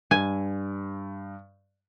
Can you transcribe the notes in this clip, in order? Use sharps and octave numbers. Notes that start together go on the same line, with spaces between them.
G2 G#5